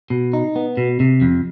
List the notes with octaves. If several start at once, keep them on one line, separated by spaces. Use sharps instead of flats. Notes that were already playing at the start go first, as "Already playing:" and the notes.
B2
D#4
B3
B2
C3
F2